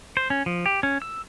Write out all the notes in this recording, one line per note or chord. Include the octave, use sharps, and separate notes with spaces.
C5
C#4
F3
G4
C#4
E6